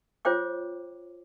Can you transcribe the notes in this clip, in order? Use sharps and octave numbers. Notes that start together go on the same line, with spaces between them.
F4 C5 C#5 G5 D6